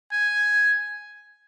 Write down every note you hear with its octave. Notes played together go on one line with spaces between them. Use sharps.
G#5